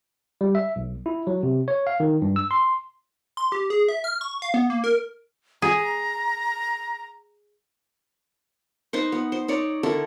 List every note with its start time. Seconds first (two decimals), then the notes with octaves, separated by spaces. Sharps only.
0.41 G3
0.55 E5
0.76 B1
1.06 E4
1.27 F#3
1.43 C3
1.68 C#5
1.87 F5
2.00 D#3
2.22 G2
2.36 E6
2.51 C6
3.37 C6
3.52 G4
3.70 G#4
3.88 E5
4.04 F6
4.21 C#6
4.42 F5
4.54 B3
4.70 A#3
4.84 A#4
5.62 G#4 A#5
8.93 D#4 B4 C5
9.12 B3
9.32 C5
9.48 D#4 C#5 D5
9.83 D3 E4 A4 A#4